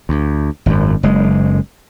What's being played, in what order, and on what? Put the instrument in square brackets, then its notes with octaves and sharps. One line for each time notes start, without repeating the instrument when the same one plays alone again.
[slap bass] D2
G#1 F#2
F#1 G#3